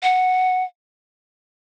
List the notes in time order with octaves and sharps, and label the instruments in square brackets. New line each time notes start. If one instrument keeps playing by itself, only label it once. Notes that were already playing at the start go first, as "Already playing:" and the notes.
[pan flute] F#5